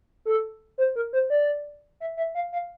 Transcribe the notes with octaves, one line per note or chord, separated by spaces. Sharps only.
A4
C5
A#4
C5
D5
E5
E5
F5
F5